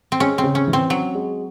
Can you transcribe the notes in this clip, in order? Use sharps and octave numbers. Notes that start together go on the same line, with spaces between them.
C4
G#3 C#4
C4
C#3
C#4
E3
C4
F#3 C#4
G#3